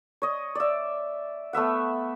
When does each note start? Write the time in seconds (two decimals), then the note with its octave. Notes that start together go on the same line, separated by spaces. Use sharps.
0.22 C#5 D#5
0.55 D5 E5
1.53 A3 B3 E5 F#5